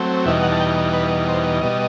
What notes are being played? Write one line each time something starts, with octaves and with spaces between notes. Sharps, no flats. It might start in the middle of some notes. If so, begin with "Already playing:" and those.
Already playing: F#3 A3 C4
E2 B2 G3 D#4 E5
F#5
A5
G5
B4
C5
B2 G3 D#5